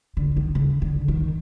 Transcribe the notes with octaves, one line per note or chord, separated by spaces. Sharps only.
D3
D#3
C#3
D3
D#3